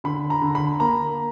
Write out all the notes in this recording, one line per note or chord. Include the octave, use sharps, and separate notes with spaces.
D3 B5
A#5
D3
B5
A#3 A#5